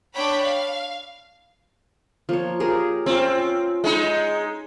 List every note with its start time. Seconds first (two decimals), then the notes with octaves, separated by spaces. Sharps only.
0.13 D4 C#5 G5 B5
0.44 F5
2.29 F3 A#3 C#5
2.60 G4 G#4 A#4
3.06 C4 C#4 F4
3.84 G#3 D#4